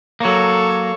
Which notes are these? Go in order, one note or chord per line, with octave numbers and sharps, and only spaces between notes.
F#3 A#3 A4 C#5